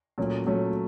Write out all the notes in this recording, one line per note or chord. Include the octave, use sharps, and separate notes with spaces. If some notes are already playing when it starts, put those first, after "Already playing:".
A#2 F#3 A3 C#4
A#2 F#3 A3 C#4